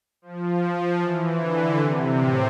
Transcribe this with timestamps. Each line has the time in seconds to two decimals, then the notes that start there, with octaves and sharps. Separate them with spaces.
0.22 F3
0.62 F3
1.00 E3
1.39 D3
1.79 C3
2.18 A2